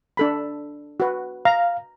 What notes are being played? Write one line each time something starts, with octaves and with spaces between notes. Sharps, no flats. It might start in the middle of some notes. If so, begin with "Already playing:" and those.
D4 A4 B5
F#4 B4
F5 A#5